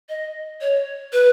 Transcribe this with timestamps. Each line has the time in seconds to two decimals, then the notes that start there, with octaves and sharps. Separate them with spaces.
0.09 D#5
0.61 C#5
1.13 B4